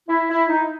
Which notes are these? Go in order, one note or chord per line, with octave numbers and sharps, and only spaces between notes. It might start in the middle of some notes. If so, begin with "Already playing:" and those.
E4
E4
D#4